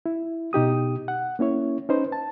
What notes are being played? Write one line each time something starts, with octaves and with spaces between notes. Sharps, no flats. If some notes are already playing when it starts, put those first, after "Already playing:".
E4
B2 D#4 G4 D#6
F#5
A#3 C#4 E4 C#5
C#4 D#4 B4 C5
A5